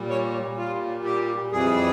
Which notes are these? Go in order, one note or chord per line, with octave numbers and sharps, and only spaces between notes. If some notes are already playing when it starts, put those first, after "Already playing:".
Already playing: A#2 G3
C#5
A#2 G3 F4
G4
F2 E3 G3 G#4